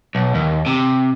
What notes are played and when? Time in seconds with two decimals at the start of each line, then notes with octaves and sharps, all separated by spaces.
0.15 B1
0.35 D#2
0.66 C3